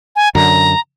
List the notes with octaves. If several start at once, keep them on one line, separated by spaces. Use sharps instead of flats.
G#5
F#2 D3 A#5